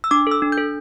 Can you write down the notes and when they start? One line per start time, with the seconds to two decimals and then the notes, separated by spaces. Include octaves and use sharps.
0.04 E6
0.11 D4 D6
0.27 A4 E6
0.42 D4
0.52 G6
0.58 A4